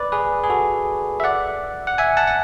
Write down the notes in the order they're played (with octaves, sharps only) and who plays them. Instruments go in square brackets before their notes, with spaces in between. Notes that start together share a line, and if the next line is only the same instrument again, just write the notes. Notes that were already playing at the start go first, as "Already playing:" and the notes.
Already playing: [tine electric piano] B4 D5
G#4 B4
G#4
F#4 A4
E5
D5 F#5
F#5
E5 G#5
F#5 A5
F#5